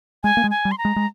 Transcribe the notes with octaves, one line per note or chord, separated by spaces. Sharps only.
G#3 G#5
A#3
G#3
G#5
G3
C6
A#5
G#3
G#3